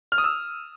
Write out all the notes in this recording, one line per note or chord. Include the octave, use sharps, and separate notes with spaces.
F6
D#6
E6